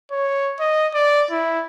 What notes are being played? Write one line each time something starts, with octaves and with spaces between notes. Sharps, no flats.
C#5
D#5
D5
E4